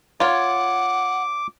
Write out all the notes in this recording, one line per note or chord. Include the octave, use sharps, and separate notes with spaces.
F4 C#5 F#5 D6